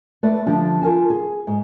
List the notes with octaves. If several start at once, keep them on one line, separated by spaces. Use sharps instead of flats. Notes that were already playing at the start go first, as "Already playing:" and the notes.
A3 B4 D5
D3 F3 G3 D4
F4 A#4 G#5 A5
G#4
G#2